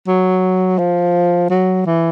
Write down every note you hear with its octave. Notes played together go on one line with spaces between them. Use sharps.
F#3
F3
F#3
E3